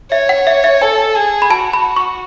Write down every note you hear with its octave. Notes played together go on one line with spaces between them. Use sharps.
C#5 E5
F#5
E5
E5
A4 G#5
G#4
B5
F#4 A5
B5
C#6